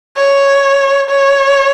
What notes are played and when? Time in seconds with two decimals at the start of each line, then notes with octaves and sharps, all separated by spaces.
0.17 C#5
1.09 C#5